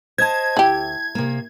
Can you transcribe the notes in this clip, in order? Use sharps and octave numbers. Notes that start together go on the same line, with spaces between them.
C5 D#5 A5 G#6
D2 E4 G4
C3 A#3